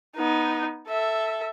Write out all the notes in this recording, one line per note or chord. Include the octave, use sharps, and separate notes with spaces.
B3 D#4
A4 E5